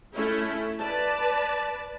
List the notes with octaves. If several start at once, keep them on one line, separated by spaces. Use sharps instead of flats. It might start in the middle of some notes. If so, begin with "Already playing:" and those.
A3 C#4 E4
B4 D5 A5